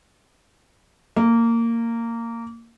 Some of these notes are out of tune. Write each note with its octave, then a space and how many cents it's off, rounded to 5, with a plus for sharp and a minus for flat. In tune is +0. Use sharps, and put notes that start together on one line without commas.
A#3 -15